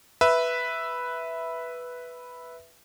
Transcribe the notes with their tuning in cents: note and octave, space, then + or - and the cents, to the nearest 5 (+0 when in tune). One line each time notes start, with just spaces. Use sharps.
B4 +0 E5 +0